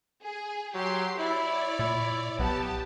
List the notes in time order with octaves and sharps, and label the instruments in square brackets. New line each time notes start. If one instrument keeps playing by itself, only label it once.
[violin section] G#4
[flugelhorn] F#3 [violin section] G4 C6
[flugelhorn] E4 [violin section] C#5 D5
[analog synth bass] A#2 [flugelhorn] E4
[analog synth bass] B1 [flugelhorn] B3 [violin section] G4 A5